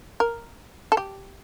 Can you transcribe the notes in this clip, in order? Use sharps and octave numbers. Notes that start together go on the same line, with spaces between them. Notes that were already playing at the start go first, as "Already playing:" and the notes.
A#4
A4
G4